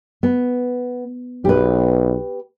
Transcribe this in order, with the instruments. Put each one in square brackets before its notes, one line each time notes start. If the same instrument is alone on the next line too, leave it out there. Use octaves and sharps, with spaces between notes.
[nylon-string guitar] B3
[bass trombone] B1 [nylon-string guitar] G4 B4